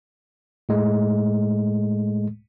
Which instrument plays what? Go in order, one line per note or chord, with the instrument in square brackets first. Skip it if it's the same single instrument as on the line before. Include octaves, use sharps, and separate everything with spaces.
[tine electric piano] A2 G#3 A3